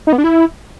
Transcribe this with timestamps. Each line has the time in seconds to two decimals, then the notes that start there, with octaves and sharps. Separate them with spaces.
0.07 D#4
0.13 B3
0.18 D4
0.24 E4